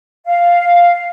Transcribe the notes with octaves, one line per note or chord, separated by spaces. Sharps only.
F5